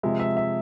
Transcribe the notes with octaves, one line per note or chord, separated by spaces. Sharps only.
C3 F3 G#3 E5
E5
E5